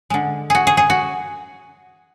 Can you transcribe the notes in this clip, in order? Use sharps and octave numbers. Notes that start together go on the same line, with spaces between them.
D3 G#3
F#4 G#4
G#4
G#4
F#4